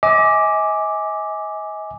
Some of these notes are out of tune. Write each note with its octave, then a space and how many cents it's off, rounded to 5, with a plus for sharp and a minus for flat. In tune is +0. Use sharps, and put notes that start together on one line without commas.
D#5 +40 G#5 +0 D6 +0